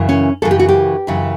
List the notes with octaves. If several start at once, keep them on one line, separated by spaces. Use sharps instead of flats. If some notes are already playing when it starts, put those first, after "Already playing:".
Already playing: F#2 C#3 E3
C#4
F#2 C#3 E3 A4
G4
F#4
G4
F#2 C#3 E3